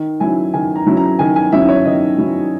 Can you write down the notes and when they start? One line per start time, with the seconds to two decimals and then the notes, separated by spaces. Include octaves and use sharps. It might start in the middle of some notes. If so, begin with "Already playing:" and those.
Already playing: D#3
0.20 F#3 C#4 E4 G#5
0.54 D#3 G#5
0.76 A#5
0.87 F#3 C#4 E4
0.97 A#5
1.19 D#3 G#5
1.36 G#5
1.52 F#3 C#4 E4 E5
1.69 C#5
1.85 D#3 D#5
2.18 F#3 C#4 E4